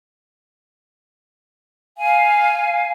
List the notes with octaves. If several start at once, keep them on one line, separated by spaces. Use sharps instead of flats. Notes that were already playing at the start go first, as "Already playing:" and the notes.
F5 G#5